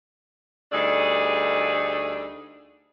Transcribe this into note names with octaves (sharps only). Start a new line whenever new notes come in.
D2 G3 A3 D4 D#4 G#4